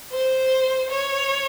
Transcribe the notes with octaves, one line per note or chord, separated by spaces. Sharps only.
C5
C#5